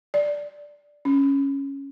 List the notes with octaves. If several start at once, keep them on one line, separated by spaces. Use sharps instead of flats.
D5
C#4